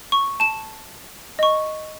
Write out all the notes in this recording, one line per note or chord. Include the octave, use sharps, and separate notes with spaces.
C#6
A5 E7
D#5 C#6